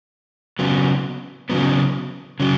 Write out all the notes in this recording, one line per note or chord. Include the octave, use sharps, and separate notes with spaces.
C#3 F#3 B3
C#3 F#3 B3
C#3 F#3